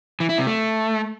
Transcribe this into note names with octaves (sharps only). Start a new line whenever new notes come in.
E3
E4
C3
A3